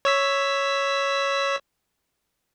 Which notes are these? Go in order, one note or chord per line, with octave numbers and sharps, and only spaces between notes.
C#5 E6 B6